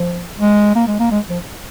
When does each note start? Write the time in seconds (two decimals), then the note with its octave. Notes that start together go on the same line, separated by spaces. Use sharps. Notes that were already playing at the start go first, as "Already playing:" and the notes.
Already playing: F3
0.37 G#3
0.75 A#3
0.88 G#3
1.00 A#3
1.11 G#3
1.29 F3